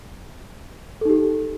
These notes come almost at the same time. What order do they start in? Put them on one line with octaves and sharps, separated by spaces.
A4 D#4 G4